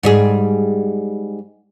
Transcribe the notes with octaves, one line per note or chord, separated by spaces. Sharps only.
G#2 G3 G#4